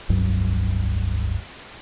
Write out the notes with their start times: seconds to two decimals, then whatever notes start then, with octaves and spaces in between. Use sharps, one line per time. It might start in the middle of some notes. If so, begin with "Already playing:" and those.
0.09 F1 C#2 G2 F#3